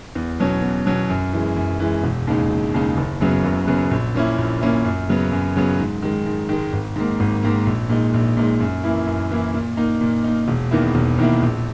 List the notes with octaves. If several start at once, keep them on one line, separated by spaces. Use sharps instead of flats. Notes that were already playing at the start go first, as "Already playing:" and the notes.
E2
B2 F#3 C#4
E2
B2 F#3 C#4
F#2
E3 G#3
F#2
E3 G#3
E1
D#2 C#3 G#3 D#4
E1
D#2 C#3 G#3 D#4
F#1
F#2 C#3 F#3 B3
F#1
F#2 C#3 F#3 B3
A#1
A#2 A#3 C#4 E4
A#1
A#2 A#3 C#4 E4
F#2
C#3 F#3 B3
F#2
C#3 F#3 B3
G#2
D#3 G#3
G#2
D#3 G#3
G#1
G#2 D#3 A#3
G#1
G#2 D#3 A#3
A#1
A#2 G#3 D#4
A#1
A#2 G#3 D#4
F#2
E3 A#3 E4
F#2
E3 A#3 E4
A#2
A#3 D#4
A#2
A#3 D#4
E1
E2 D#3 A#3 E4
E1
E2 D#3 A#3 E4
A#1